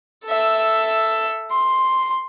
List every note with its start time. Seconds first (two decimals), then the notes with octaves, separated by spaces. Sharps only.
0.25 A4 E5
1.51 C6